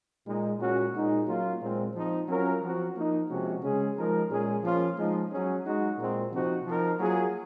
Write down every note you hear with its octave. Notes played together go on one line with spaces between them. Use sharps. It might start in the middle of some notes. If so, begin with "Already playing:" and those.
A#2 G#3 D#4
A#2 G#3 C#4 F#4
A#2 G#3 D#4 G#4
F#3 A#3 C#4 F4
A#2 G#3 C4
F3 C4 D#4
F#3 C#4 F4 A#4
F3 C4 F#4
F3 A#3 D#4
C3 F3 G#3 C#4 F#4
C#3 G#3 C#4 G#4
F3 G#3 D#4 A#4
A#2 G#3 C#4 G#4
F3 A#3 C#4 F4
F3 G#3 D#4
F#3 C#4 G#4
G#3 D#4 F#4
A#2 G#3 C4
C3 F3 C4 D#4 F#4
F3 C4 D#4 A#4
F#3 A#3 F4 G#4